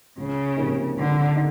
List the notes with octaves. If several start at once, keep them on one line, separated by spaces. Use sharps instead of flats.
C#2 C#3
C3 F3 A#3 D#4
C#2 D3
D#4